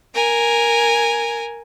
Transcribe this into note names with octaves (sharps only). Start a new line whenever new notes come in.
A#4 G#5